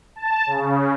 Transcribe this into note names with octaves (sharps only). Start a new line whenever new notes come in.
A5
C#3